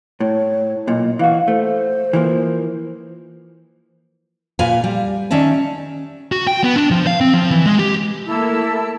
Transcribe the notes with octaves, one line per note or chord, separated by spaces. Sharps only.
A2 C#5
B1 A#2 D#5
E3 F#4 F5
A3 C5
E3 F3 A#3
A#2 F4 B4 F5 G#5
G3
D#3 C#4 D5 E5 A5
F#4
G5
B3
D4
F3
F5
C4
F3
E3
G#3
G4
A3 A#3 E4 A4 A5 E6